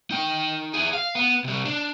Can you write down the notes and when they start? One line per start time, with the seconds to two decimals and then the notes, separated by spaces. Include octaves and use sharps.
0.11 D#4 G5
0.74 E4 G#4
0.93 F5
1.15 B3
1.44 C3 G3
1.65 D4